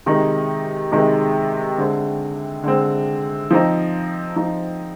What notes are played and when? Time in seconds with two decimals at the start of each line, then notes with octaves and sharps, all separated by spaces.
0.06 C3 D#3 G#3 D#4
0.92 C3 D#3 G#3 D#4
1.78 D3 G#3 C4
2.64 D3 G#3 C4
3.51 F3 C4 D#4
4.36 F3 C4 D#4